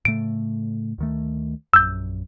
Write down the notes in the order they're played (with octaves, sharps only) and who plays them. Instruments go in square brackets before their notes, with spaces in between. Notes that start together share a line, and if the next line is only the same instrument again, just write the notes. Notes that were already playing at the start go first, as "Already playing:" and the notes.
[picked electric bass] A2 C#3 A3 [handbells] D7
[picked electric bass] D2 D#3 A3
[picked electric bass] A#1 F#2 [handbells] E6 G6